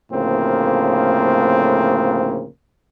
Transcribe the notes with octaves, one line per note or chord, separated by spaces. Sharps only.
D2 A2 C#3 F3 A#3 C4